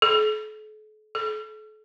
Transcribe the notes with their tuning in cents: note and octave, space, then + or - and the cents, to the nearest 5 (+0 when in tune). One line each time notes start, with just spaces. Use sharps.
A4 -45
A4 -40